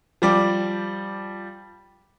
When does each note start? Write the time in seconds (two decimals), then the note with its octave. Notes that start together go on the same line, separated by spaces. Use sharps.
0.22 F3 G3 D6